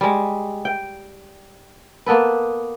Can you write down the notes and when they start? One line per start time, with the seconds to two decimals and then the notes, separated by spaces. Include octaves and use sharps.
0.01 G3 G#3
0.65 G5
2.06 A#3 B3 A4 B4